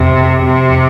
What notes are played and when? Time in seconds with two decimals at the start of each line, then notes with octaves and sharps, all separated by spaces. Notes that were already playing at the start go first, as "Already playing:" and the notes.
Already playing: F2 C3
0.45 C3